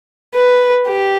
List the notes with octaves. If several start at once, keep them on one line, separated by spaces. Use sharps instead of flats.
B4
G4